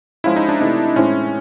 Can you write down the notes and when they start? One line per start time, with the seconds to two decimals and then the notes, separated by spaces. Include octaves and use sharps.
0.24 F3 G#3 C#4 E4 F4
0.36 D#4
0.49 D4
0.60 C3 E3 A3 D#4
0.96 A2 E3 G#3 C4 C#4 E4